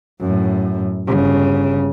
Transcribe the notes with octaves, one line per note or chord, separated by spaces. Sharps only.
F#2 A2
G1 C#3